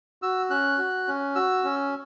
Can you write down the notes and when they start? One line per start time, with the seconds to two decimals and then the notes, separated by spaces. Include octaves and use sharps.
0.22 F#4 E6
0.50 C#4 F#6
0.78 F#4
1.08 C#4
1.35 F#4 E6
1.64 C#4